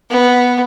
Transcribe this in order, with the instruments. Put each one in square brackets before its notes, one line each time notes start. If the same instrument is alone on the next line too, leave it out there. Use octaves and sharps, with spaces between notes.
[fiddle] B3